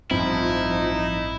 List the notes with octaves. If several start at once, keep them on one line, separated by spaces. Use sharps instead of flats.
A1 G2 F3 C4 D#4 E4